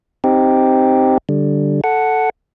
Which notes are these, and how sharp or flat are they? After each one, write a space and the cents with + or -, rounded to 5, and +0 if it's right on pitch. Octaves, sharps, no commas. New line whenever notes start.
C4 +0 D#4 +0 G4 +0
D3 +0 G3 +0
A4 +0 F#5 +0